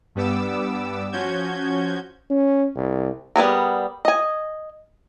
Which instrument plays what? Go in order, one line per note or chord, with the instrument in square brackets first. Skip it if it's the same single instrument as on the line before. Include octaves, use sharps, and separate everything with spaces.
[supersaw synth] G2 G3 B3 D6 E6
F3 C#4 F#4 G6 G#6
[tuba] C#4
C2
[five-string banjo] G3 B3 G#4 A#4
D#5 G#5